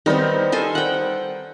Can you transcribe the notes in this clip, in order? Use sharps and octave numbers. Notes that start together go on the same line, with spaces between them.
D#3 G3 B3 C4 D#4
A4 C5 G#5
F#5 G5